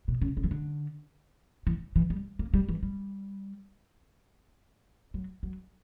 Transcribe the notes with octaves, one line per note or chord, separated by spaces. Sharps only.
B2
C#3
C#3
E3
D3
E3
E3
G3
A#3
G3
E3
G3
F#3
F#3